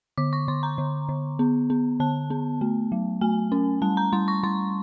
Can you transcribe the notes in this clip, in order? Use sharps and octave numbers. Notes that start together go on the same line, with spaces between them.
D3 D6
C#6
D3 C6
A#5
D3
D3
B3
B3
D3 A5
B3
A3
F#3
A3 G#5
C#4
G3 A5
A#5
G3 C6
C#6
G3 C6